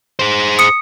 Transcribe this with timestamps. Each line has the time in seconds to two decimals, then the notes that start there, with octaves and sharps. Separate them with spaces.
0.19 G#4 C5
0.59 D#6 C#7